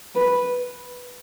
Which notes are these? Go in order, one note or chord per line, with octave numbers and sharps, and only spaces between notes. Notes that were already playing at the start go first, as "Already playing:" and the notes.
B4